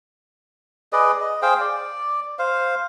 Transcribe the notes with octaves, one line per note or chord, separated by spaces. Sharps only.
G#4 B4 D5 D#5
D#5
G#4 C5 F5 G5
D5
C5 F5